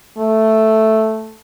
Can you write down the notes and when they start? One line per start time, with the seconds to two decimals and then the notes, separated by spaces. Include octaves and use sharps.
0.18 A3